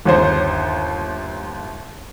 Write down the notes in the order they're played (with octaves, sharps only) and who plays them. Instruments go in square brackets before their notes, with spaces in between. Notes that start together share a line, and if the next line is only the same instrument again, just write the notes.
[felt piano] G1 D#2 C5